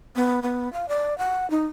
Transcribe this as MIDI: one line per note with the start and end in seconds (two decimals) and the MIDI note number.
0.16 0.42 59
0.43 0.71 59
0.73 0.88 77
0.88 1.17 74
1.18 1.49 78
1.50 1.64 63